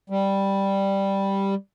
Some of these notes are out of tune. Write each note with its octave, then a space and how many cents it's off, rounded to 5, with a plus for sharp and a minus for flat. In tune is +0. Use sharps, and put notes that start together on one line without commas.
G3 +0